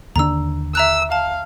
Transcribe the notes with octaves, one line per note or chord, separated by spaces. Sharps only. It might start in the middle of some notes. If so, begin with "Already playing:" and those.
D#2 D3 D4 A#5 E6
E5 A#5 E6 F#6
F5 A5